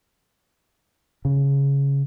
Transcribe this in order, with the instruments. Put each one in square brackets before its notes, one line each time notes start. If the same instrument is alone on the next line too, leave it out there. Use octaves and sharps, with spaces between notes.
[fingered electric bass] C#3